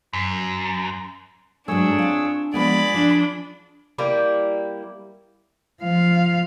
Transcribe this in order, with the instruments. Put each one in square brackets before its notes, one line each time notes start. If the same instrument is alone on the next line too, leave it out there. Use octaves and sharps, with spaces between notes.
[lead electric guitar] F#2
[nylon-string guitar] G#2 F#3 A3 [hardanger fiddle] D4 [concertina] G#4 C#5 E6
[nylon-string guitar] C4 F4
[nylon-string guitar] F3 G#3 B3 [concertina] G#4 G#5 [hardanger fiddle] D5 B5
[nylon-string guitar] F3 [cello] D4
[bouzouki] G3 A#3 E4
[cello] F3 F5